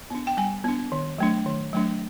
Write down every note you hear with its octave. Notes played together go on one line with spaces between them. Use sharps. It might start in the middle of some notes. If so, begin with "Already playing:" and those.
B3 D4
G5
G3 G#5
B3 D4
D#3
F#3 A3 D4
D#3
F#3 A3 D4